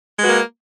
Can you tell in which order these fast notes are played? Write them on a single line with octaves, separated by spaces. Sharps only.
G#3 B4 F#4 A#3